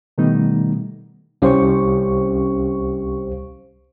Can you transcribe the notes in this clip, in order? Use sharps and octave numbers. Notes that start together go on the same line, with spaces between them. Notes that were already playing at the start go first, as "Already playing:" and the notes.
B2 D#3 G3 A3 B3 D#4
C2 C#4 G4 C5 F5 C#6